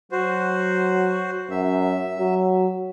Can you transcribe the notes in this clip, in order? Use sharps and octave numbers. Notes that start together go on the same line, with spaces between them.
F#3 F#4 C5
F#2 E5
F#3